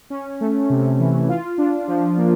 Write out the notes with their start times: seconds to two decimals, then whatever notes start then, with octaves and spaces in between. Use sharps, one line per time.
0.10 C#4
0.41 A3
0.70 C3
0.99 E3
1.29 F4
1.58 D4
1.88 F3
2.17 A#3